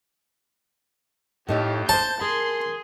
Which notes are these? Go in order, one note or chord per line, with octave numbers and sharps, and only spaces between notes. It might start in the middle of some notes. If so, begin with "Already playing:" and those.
F2 A2 D#4 G4 C#5
C5 C#5 A5 G6
G#4 A#4 C6